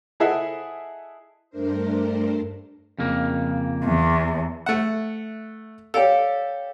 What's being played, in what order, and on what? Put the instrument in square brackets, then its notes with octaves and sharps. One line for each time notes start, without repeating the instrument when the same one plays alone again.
[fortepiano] E4 G#4 A4 D#5 E5 F#5
[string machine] G2 A3 D4 A#4 C5
[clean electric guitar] F2 C#3 A#3
[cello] E2
[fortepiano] A3 F#5 [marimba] E5
[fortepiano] G4 A4 [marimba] C#5 D5 F5